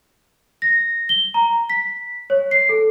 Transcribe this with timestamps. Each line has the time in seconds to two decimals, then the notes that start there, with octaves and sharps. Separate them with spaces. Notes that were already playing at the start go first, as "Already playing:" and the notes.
0.62 A#6
1.09 G7
1.34 A#5
1.70 B6
2.30 C#5
2.51 C7
2.69 A4